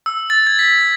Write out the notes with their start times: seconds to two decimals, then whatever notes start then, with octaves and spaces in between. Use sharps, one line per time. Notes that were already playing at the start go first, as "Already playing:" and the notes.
0.06 E6
0.30 A6
0.47 G#6
0.59 B6